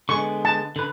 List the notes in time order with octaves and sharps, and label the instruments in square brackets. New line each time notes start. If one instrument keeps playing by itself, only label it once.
[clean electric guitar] D3 G#3 B3 [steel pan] C#6
[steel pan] A5
[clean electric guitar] D3 B4